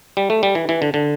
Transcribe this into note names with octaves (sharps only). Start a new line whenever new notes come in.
G3
A3
G3
E3
E3
D3
D3